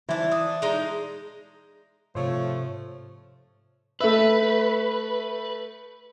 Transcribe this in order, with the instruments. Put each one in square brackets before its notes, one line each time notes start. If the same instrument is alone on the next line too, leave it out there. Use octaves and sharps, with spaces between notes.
[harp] E3 [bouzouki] D4 C5
[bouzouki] D4 [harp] D#6
[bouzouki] G#3 D#4
[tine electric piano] G#2 C3 [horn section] F3 A3 [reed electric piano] C5 C#5
[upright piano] A3 E5 [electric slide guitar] B4